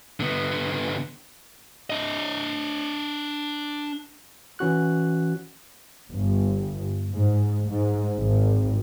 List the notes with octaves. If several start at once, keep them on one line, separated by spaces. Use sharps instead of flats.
D3 B3
D4 D#5
E3 C#4 F#4 F#6
G1
G#2
G#2
G#1